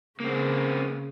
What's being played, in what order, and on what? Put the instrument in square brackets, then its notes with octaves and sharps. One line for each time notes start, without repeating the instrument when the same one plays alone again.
[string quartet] C#3 [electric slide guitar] A#3 C4